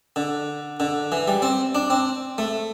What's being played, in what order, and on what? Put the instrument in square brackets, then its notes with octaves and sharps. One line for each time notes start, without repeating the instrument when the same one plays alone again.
[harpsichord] D3
D3
E3
G3
C4
D4
C4
A3